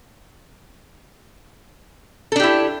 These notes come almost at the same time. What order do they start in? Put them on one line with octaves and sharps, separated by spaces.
A4 D4 G4 E4